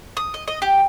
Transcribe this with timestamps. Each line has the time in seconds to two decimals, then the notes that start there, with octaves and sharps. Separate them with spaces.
0.17 D#6
0.34 D#5
0.48 D#5
0.62 G4